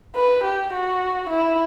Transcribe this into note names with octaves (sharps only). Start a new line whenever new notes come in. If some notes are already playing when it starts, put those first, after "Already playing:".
B4
G4
F#4
E4